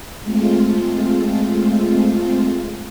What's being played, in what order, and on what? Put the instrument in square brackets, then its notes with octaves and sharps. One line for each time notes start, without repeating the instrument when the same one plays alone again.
[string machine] G#3 A3 C4 F4